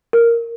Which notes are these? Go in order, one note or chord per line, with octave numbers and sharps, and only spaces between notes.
A#4